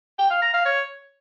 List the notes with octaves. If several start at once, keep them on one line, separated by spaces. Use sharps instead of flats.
G5
F5
A#5
F5
C#5